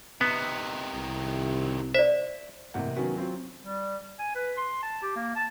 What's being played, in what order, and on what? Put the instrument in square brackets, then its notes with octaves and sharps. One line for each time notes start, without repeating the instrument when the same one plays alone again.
[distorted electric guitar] C3 D#3 [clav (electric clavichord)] B3
[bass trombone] C2
[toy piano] C5 D5 [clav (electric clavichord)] E5
[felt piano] A1 C3 A#3 F#5
D#3 F#3 B3 C#4 F#4 B4
F#3 C4 F4
[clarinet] G3
G#5
B4
C6
A5
G4
A#3
A5